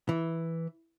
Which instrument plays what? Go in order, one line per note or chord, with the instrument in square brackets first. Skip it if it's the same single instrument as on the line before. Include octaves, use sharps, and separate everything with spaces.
[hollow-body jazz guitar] E3